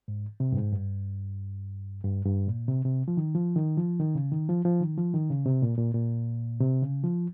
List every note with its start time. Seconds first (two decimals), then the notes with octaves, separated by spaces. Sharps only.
0.08 G#2
0.40 C3
0.52 G2
0.57 G#2
0.73 G2
2.04 G2
2.25 G2
2.47 A#2
2.68 C3
2.85 C3
3.08 F3
3.17 D#3
3.35 F3
3.56 D#3
3.77 F3
3.99 D#3
4.15 C#3
4.32 D#3
4.49 F3
4.65 F3
4.81 D#3
4.98 F3
5.14 D#3
5.30 C#3
5.46 C3
5.62 A#2
5.78 A#2
5.94 A#2
6.60 C3
6.82 C#3
7.03 F3